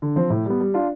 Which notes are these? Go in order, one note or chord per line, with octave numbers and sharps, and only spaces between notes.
D3
F3 C4
A2
G3 B3
G3
D4 F4